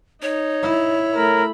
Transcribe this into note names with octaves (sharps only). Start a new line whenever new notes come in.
D#4 C#5
E4
A3 A#4 B5